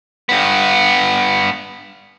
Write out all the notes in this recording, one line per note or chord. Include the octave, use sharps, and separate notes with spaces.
G2 B3